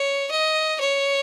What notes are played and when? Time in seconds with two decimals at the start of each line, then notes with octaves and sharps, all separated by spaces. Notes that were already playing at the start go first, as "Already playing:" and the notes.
Already playing: C#5
0.31 D#5
0.81 C#5